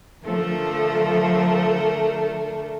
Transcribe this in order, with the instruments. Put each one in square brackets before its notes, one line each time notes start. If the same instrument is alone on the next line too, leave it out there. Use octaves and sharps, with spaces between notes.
[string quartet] D3 A3 A#4 [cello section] F3 A4